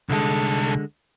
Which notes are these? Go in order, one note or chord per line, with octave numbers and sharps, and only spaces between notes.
C2 D3 G#3 A4